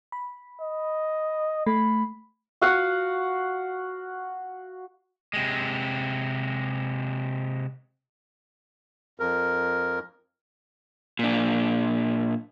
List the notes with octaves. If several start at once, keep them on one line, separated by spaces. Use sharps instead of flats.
B5
D#5
A3 B5
F#4 F5 F#5
C3 G#3
F2 A#4
A#2 D4